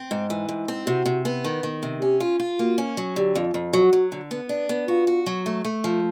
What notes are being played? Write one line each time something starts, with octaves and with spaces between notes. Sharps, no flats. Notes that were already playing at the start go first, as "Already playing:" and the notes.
Already playing: C4
G#2
E3
G#2
C4
C3 F#4
C3
B3
D#3
D#3
C3
C#4 G4
F4
F4
A#3 F#4
C#4
F#3
D3 G4
F2
F2
F#3 F#4
F#3
D3
B3
D4
B3
F4 F#4
F#4
F#3
A3
A3
F3